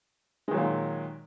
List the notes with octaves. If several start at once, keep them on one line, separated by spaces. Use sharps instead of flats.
A#2 D#3 F#3 G#3